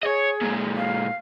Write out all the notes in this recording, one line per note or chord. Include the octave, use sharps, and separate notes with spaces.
G#4 C#5 D#5
A#2 G#3
F5